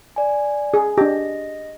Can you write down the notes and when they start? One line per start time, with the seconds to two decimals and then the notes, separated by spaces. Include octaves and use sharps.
0.16 D5 G#5
0.74 G#4
0.98 D4 G4 D#5 A#6